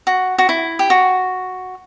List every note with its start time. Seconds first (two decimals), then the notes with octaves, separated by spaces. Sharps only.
0.07 F#4
0.38 F#4
0.49 E4
0.79 G4
0.90 F#4